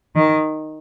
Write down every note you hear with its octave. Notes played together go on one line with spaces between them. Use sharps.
D#3